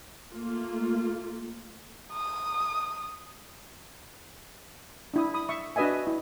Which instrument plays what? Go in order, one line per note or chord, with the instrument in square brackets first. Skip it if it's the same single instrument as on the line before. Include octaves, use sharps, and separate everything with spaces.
[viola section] A3 A#3 F4
[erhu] D#6
[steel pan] D4 E4 D#6
B5 D#6
E5 C#6
D4 F#4 B4 D#5 E5 G#5
E4